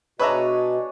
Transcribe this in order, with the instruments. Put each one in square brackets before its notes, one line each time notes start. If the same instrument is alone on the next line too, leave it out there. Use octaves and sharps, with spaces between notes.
[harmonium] B2 [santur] D4 G#4 C#5 [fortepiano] B4 E5 A#5 [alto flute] D#5